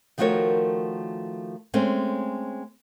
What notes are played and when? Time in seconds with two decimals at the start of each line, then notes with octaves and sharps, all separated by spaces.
0.18 D#3 F3 A3 F#4 A#4 C#5
1.74 G#3 A3 C4 C#4